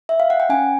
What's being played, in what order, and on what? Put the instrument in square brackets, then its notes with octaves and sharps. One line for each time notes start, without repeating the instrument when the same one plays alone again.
[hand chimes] E5
F5
F#5
G5
C#4 G#5